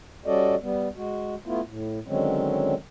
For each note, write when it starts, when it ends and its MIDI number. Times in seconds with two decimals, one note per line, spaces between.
0.26 0.55 55
0.26 0.55 61
0.26 0.55 66
0.26 0.55 69
0.26 0.55 74
0.26 0.55 75
0.62 0.88 55
0.62 0.88 59
0.96 1.35 56
0.96 1.35 66
1.46 1.61 57
1.46 1.61 59
1.46 1.61 64
1.46 1.61 65
1.66 1.99 45
2.08 2.74 50
2.08 2.74 51
2.08 2.74 54
2.08 2.74 56
2.08 2.74 60
2.08 2.74 61